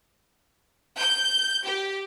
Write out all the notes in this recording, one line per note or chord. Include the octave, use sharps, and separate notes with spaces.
G6
G4